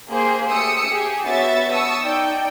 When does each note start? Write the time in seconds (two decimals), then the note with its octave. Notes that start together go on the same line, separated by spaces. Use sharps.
0.10 A#3 G4 G#4 C5
0.50 A3 G4 D#6 E6 C#7
0.86 G4 G#4
1.25 B3 F#4 C#5 E5 A6
1.72 A5 C#6 D#6 E6
2.03 D#4 D5 G5